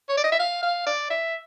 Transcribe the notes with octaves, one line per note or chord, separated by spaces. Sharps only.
C#5
D5
D#5
E5
F5
F5
D5
E5